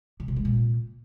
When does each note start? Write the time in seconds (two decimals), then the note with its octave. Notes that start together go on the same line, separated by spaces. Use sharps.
0.20 C#3
0.28 C3
0.37 G#3
0.45 A#2